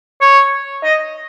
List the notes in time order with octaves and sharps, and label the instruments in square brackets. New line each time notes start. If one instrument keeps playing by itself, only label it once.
[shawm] C#5
D#5